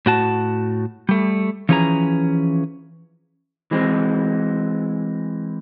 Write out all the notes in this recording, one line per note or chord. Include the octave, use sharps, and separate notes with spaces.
A2 F#4 A5
G3 A3
E3 F3 C#4 G#4 B4 A#5
E3 G#3 C4